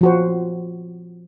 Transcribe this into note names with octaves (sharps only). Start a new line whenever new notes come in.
F3 F#4 C5